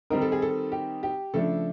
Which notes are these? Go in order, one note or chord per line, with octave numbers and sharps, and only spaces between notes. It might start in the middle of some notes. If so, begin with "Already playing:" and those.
D#3 G3 C4 D#4 A#4
A4
G#4
A4
G4
G4
C#3 F3 A3 D4 A4